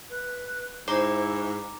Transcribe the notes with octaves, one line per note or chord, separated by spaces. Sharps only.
B4
G#2 E4 C5 A#5 D6